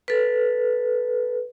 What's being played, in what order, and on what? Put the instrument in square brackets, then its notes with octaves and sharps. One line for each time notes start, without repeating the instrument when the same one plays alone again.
[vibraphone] A4 B4